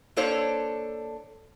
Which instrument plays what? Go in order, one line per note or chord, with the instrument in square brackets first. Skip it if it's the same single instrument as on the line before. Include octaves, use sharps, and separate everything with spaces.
[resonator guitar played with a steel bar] A#3 D4 A4 C5 C#5